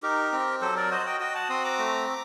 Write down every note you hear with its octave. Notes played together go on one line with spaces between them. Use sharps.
D#4 G4 A#4
C4
F#3 A4 C5
A#4 D5
F#4 C5 D#5
D#5 G5
F#4 D#5 G5
F#5 A5
C4 C6 D#6
A#5 D6
A3